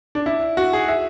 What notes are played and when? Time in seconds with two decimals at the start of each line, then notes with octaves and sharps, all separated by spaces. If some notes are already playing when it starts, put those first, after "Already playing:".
0.15 D4
0.26 E4
0.57 F#4
0.73 G#4
0.88 E5